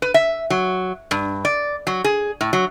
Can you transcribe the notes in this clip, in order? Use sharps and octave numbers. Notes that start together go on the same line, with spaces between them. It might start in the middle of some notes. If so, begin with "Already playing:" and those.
B4
E5
F#3
G2
D5
F#3
G#4
A2
F#3